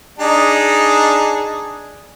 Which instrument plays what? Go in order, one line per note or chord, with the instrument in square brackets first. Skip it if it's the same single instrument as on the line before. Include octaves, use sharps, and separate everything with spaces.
[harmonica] D4 D#4 G#4